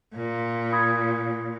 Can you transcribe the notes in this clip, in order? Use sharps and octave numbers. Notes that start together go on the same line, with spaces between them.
A#2
B5 D#6 G#6